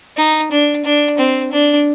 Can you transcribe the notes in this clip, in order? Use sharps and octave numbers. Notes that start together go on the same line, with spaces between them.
D#4
D4
D4
C4
D4